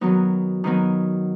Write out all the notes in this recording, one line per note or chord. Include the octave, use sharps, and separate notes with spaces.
D#3 F#3 B3 D#4
D#3 F#3 B3 D#4